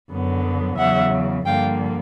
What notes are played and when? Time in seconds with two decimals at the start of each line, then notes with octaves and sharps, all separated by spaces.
0.11 F#2 D3 F#3 B3
0.78 E2 C#3 F#3 E5 F#5
1.46 G2 D3 F3 A#3 F5 G5